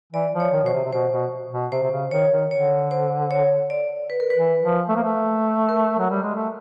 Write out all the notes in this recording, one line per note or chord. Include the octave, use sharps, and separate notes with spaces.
E3 D5
F3
C#5
D#3
B2 C5
C3
C3
B2 C5
B2
B2
C3 C5
C3
C#3
D#3 C#5
D#3
D3 C#5
C5
C#5
D5
B4
A#4
B4
E3
F3
A3
A#3
A3
A#4
F#3
G3
G#3
A3